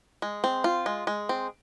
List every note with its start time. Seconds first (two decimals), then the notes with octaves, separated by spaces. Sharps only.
0.22 G#3
0.44 C4
0.64 F4
0.86 G#3
1.07 G#3
1.29 C4